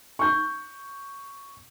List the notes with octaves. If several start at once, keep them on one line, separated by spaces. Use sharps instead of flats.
C#6 G6